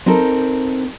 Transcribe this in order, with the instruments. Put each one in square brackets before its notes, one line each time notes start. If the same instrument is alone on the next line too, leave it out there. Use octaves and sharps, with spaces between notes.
[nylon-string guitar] C4 D#4 A4 A#4